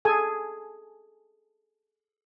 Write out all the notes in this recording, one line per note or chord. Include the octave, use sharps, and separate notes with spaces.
G#4 A4 G#5